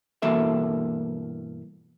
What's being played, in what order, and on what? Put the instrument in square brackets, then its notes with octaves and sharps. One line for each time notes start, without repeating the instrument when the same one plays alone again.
[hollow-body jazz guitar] G2 B2 E3 A#3 A4 E5